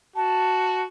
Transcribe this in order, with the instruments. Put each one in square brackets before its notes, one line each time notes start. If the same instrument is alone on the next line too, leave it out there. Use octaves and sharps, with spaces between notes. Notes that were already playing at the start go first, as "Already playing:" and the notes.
[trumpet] F#4 [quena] A5